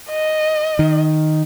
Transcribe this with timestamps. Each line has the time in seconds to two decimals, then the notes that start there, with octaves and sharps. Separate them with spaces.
0.10 D#5
0.79 D#3